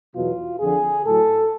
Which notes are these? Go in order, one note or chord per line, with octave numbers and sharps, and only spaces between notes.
E2 B2 F#3 F4
F2 D3 F3 G#4
A2 F#3 A4